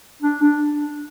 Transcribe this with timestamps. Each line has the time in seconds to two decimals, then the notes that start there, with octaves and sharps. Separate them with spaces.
0.23 D4
0.42 D4